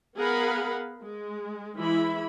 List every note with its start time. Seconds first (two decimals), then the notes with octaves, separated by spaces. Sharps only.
0.17 B3 G#4 A#4 F5 F#5 B5
1.01 G#3
1.77 E3 G#3 E4 E5 B5